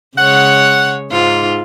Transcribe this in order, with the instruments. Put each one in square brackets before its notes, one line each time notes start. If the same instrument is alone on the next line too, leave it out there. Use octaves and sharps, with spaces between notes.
[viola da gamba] C#3 G#3 C#5 [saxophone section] F#5
[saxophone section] G#2 [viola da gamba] F4